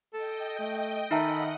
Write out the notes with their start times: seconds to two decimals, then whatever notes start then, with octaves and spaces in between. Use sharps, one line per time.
0.13 A4 D#5 G5
0.59 A3
1.11 D#3 D#4 A4 D#5 E5 F#5 A#5 B5